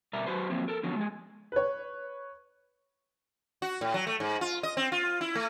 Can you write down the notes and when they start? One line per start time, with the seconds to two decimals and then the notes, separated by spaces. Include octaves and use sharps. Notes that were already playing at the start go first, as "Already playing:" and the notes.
0.13 B2 G3 A#4 D5 E5 A#5
0.26 F#3 F#4 B4 C5
0.50 F3 F#3 A#3 C4
0.68 A4 A#4
0.83 D3 F3 F#3 B3 C#4
0.96 G#3 G#4
1.52 B4 C#5
3.62 F#4
3.81 A2
3.94 F#3
4.07 A3
4.20 G#2
4.41 F4
4.63 D#5
4.77 C4
4.92 F4
5.21 E4
5.35 A3